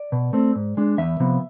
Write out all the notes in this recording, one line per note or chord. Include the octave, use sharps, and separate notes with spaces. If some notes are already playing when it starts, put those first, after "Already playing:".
Already playing: D5
B2
A3 C4
G#2
G#3 D4
E2 E5
C3 F3 B3